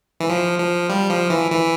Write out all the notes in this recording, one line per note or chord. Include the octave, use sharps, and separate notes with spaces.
E3
F3
F3
G3
F3
E3
E3